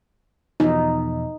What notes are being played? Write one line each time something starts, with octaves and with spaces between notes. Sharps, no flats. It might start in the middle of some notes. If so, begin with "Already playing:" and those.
E2 B2 F3 D#4